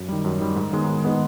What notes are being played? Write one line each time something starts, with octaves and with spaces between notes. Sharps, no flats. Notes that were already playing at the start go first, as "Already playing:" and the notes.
Already playing: F#2
D#3 G3
F#2
D#3 G3
G#2
D#3 G#3 B3
G#2
D#3 G#3 B3